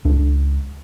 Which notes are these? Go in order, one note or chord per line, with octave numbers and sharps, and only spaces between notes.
C#2 D4